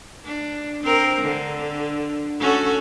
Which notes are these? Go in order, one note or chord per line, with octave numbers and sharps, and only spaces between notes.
D4
C4 A#4
D3
C#4 F#4 A4